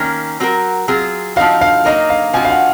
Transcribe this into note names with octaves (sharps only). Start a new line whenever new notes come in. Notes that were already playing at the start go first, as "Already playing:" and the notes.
Already playing: D#3 A#3 C#4
F#3 C4 F#4 A#4
F#3 C4 F4 G#4
F3 C4 D#4 F#4 F5
F5
F#3 A#3 D#4 A#4 D#5
F5
F3 C4 F#4 G#5
F5
F#5